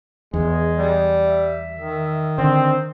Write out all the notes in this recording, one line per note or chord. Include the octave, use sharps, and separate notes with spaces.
E2 G#3
G3
E5
D#3
D3 C4